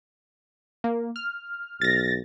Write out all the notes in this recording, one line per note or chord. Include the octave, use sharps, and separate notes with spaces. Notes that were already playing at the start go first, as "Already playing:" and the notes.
A#3
F6
B1 A6 A#6